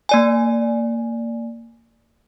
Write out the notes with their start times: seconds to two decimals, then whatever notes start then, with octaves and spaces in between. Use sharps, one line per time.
0.09 A#3 D5 G#5